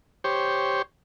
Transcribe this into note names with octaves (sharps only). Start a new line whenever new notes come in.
G4 C5 C#5